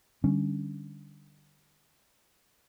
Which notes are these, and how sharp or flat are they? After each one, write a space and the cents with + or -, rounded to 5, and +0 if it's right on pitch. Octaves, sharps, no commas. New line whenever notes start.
D3 +15 G3 +0 C#4 +0